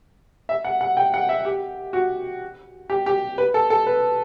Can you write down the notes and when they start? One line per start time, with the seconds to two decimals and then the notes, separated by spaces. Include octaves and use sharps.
0.49 E5
0.64 F#5
0.81 F#5
0.97 G5
1.14 F#5
1.29 E5
1.45 G4
1.93 F#4
2.90 G4
3.06 G4
3.38 B4
3.54 A4
3.70 A4
3.87 B4